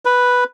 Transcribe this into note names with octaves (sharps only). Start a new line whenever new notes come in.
B4